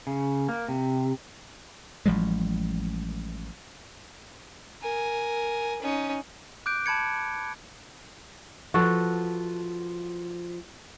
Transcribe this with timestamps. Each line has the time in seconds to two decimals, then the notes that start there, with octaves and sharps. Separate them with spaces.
0.07 C#3
0.49 A#3
0.68 C3
2.06 A1 F3 G3 G#3
4.82 A#4 G#5
5.82 C#4 D#4
6.66 D6 F#6 G6 D7
6.86 A5 B5 G#6 C#7
8.74 F3 F#4 A4 B4